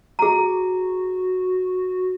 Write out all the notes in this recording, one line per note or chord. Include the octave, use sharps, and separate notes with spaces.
F#4 G#4 A#5